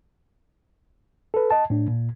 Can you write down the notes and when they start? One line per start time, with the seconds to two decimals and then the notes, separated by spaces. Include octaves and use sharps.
1.34 A4 B4
1.51 D#5 A5
1.70 A2 D4
1.88 A#2